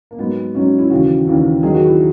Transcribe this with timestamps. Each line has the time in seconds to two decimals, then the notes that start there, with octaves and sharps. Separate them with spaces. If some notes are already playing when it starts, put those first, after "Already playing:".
0.11 A#3
0.18 G#2 F#3 B3
0.55 G#2 F#3 C#4
0.79 E4
0.90 D#2 C#3 E3 F#4
1.27 D#2 C#3 E3
1.63 D#2 D#3 F#3 G#4
1.75 F#4
1.86 E4